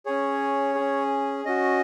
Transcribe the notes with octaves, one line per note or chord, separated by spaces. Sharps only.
C#4 G#4 C#5
C#4 G#4
C#4 F#4 D#5